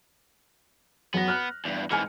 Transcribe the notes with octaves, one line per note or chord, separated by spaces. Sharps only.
F#2 B3 F#5 A#6
F6 F#6
E2 G2
G#2 E3 G#5 F6 C#7